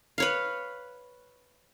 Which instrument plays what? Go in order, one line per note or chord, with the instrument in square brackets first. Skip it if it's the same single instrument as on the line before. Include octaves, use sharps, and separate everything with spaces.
[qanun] B4 C#5 F5